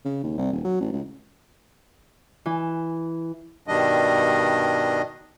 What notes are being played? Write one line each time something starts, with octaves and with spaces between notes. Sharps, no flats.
C#3
D#2
C2
D#1
F#3
A1
C#2
E3
G2 B2 D#3 G3 D4 D#5